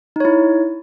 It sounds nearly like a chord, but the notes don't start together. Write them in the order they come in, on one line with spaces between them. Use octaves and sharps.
D#4 C#5 E4